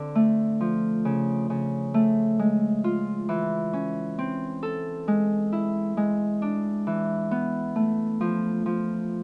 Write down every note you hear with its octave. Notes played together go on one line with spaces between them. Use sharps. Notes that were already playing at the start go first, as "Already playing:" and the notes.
Already playing: D3 C4
A3
F3
C#3
C#3
A3
G#3
F4
E3
C#4
C4
A4
G#3
E4
G#3
D4
E3
B3
A3
F3
F3